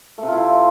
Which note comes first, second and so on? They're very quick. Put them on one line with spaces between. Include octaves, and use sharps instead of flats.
A3 C3 F4 E4